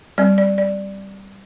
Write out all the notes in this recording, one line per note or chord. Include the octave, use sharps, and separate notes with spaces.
G3 C4 D5
D5
D5